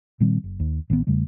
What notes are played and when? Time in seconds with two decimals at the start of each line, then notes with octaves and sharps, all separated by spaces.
0.20 A#2 D#3 G3 C4
0.44 F#1
0.60 D#2
0.90 A1 D#3 F#3 B3
1.07 E2 C#3 G3 A3